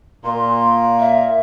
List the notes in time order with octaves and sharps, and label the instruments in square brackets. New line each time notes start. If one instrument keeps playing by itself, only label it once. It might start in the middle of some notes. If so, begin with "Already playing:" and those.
[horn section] A#2 [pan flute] C6
[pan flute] E5